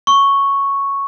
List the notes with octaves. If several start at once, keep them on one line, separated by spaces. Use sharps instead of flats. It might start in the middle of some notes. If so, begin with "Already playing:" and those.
C#6